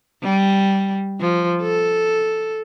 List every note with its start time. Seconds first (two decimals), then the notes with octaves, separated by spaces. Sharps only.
0.23 G3
1.21 F3
1.62 A4